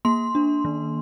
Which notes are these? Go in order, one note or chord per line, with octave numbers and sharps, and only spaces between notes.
A#3 C6
D4
D#3